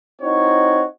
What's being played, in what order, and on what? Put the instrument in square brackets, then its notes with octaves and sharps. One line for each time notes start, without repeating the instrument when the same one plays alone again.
[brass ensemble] C4 D#4 E4 F#4 C#5